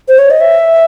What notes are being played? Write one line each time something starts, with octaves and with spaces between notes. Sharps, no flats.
C5
C#5
D#5
E5